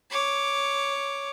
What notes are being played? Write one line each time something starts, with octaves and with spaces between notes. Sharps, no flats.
C#5 D6